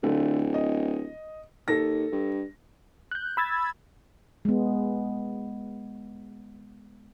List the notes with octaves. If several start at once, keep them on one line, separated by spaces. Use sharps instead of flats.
D1 D3 A3 F4
D#5
D#2 A4 A#6
G2
F#6 G6
B5 E6 G#6 A6
G#3 B3